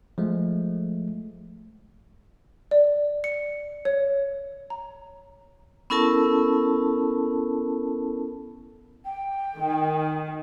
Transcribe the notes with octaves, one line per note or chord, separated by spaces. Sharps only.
F3 G#3 A3
D5
C#7
C#5
A#5
B3 C#4 E4 A4 A#4 A5
G5
D#3